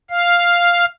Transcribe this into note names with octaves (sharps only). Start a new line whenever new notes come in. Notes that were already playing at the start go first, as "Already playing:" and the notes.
F5